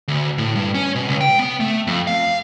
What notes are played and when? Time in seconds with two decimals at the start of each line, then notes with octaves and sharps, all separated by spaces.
0.08 D2
0.38 A2
0.56 G2
0.75 C#4
0.95 B2
1.08 C#2
1.21 G5
1.39 B3
1.60 A3
1.87 F2
2.07 F5